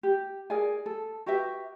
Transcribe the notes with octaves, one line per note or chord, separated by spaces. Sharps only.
G4
G#4 A#4 D5 G#5
A4
F#4 G4 B4 E5